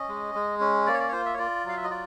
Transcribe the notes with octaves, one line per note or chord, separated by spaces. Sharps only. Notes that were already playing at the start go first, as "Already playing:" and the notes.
Already playing: C#4 D#5
G#3
G#3
C#4
A#3 D5
C#5
D5
C#5
F4 C5
E5
C#5
F4 D5
F#3 F5
E5
D#5
F4 D5